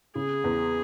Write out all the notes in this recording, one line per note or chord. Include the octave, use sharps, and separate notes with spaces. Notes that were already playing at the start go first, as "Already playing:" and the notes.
C#3 G#4
E2